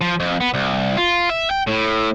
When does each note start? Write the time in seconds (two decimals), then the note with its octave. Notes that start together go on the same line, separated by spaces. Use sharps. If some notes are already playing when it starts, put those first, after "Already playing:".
0.01 F3
0.20 F2
0.40 B3
0.54 C2
0.97 F4
1.29 E5
1.50 G5
1.67 A2